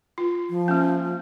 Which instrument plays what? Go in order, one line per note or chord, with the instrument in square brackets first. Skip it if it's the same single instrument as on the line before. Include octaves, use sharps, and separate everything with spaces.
[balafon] F4
[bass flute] F3
[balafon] A#3 C#4